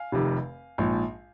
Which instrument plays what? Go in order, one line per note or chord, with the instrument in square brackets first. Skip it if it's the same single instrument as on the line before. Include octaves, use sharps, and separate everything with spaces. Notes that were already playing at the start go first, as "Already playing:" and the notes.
Already playing: [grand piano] F5 G#5
F1 F2 C3 D#3
A#1 G#2 F3